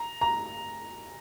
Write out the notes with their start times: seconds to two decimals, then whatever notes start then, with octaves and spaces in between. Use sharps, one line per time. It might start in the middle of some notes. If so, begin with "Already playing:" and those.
Already playing: A#5
0.21 A#5